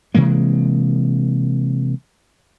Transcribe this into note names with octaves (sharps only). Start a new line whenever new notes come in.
C3 E3 G#3 A#3